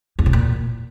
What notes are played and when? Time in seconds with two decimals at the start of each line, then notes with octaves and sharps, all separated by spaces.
0.19 E2
0.26 B2
0.33 A#2